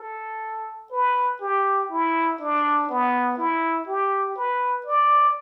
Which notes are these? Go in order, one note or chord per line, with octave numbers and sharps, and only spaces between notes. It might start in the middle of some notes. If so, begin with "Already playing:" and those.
Already playing: A4
B4
G4
E4
D4
B3
E4
G4
B4
D5